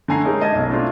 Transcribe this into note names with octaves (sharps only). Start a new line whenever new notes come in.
D3 A3 G#5 A#5 C7
G#3 C#4 D#4 G4 A#4
D#5 A5 D#6 G#6
B1
A3 C4 D4 E4 F4